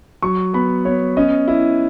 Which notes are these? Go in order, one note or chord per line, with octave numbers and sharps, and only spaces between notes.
F#3 C#6
B3 B5
B3 C#5
C#4 D#5
E4